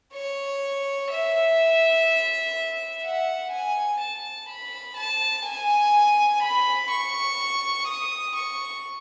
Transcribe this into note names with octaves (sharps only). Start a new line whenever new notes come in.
C#5
E5
F#5
G#5
A5
B5
A5
G#5
B5
C#6
D#6
C#6